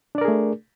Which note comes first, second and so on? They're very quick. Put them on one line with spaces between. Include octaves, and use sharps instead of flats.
D4 D5 A#4 G#4 A3